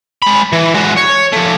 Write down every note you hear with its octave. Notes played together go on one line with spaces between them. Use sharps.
G#3 B5
E3
G#3 F#4
C#5
F3 A3